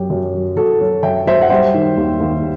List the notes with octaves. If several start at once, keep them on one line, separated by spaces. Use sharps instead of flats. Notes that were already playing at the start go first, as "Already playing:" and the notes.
Already playing: F#2 F#3 G4
F#2
F#3
F#2 F#4 A4
F#3
F#2 E5 G5
F#3 C5 E5
F#5
G3 C5 E5
D#3
D#2
D#2